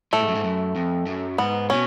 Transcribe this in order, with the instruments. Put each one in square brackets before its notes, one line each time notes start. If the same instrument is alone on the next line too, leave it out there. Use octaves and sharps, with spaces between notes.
[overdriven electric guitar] A2 [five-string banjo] A3
[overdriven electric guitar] G#2
F#2
G#2
F#2
F2
F#2
[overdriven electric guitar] G#2 [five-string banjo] B3
[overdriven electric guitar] B2 [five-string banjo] C#4